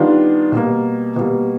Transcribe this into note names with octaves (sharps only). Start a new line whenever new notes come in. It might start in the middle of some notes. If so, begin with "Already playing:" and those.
Already playing: D#3 G3 B3 D4 F4
B2 G3 A#3
B2 G3 A#3